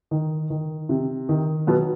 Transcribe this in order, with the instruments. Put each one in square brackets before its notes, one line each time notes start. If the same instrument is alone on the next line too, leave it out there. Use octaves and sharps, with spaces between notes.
[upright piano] D#3
D#3
C3
D#3
B2 F#3 B3